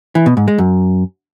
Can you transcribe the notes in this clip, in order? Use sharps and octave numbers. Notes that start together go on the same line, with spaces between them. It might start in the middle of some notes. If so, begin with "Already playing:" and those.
E3
B2
G#2
G#3
F#2